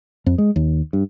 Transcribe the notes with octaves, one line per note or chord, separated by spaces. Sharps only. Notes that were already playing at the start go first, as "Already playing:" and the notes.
F2
G#3
D#2
G2